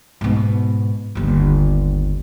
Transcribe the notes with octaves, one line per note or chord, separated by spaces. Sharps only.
G#2 B2
G1 D#2